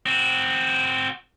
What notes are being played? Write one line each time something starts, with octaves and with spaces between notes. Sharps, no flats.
C4 F#4